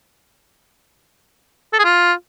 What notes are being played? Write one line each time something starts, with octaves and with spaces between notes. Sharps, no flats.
A4
G#4
F4